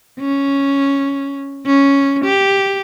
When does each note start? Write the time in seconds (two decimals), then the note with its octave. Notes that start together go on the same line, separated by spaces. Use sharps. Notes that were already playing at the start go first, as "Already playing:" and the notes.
0.20 C#4
1.66 C#4
2.24 G4